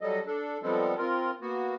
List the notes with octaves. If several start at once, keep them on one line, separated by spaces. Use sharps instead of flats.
F#3 G3 A4 D#5
D4 A4
F3 G3 G#3 B3 C4 A4
C4 F4 A#4
A#3 B3 F#4